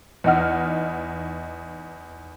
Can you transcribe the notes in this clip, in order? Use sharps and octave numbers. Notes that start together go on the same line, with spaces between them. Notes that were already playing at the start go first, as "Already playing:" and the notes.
E2 D#4 D#5 F#5 F6